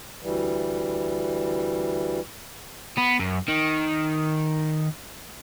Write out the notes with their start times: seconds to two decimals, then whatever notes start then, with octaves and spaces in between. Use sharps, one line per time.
0.23 D2 E3 G3
2.97 B3
3.19 F#2
3.48 D#3